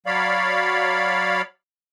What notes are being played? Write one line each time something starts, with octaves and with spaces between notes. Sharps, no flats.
F#3 C#5 D5 F5 B5